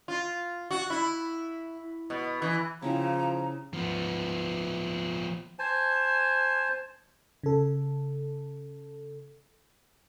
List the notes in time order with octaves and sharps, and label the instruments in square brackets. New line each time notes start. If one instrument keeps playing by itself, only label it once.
[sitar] F4
F#4
E4
B2
E3
[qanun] C#3 E4 G4 [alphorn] F3 [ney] A#5
[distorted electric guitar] F3 B3
[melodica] C5 G#5 A5
[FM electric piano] C#3 A4